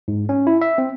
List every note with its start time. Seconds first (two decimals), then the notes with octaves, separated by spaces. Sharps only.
0.08 G#2
0.29 C#4
0.47 E4
0.62 E5
0.78 C4